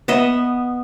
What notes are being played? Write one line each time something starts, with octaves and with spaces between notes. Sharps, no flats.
B3 D#5 E5